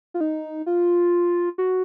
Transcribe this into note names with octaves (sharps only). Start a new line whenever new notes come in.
F4
D#4
F4
F#4